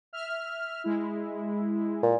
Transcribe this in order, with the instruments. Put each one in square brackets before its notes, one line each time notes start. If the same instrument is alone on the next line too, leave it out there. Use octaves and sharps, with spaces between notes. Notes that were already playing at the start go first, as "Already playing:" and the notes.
[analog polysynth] E5 F6
G#3 E4
[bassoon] A#2